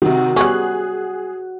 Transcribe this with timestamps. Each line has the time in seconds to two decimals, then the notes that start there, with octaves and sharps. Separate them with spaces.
0.02 C3 D#3 F#4
0.36 G3 B3 C#4 G#4 F#6